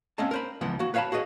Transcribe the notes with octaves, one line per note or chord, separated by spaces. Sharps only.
A#3 C4 C#4 D#5 A5
A#4 C5 B5
C#2 E3 F3 B3 F#5
A#3 F#4
B4 C#5 F5 F#5 A5 B5
F#4 G#4 B4 D#5